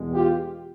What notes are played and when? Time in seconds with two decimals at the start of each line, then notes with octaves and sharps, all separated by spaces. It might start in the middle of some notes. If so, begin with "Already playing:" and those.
Already playing: E2 B2 G#3
0.14 F4 G4